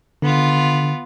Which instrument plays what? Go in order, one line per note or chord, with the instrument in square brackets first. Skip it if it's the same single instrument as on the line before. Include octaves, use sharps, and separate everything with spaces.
[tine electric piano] D3 [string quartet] B3 F4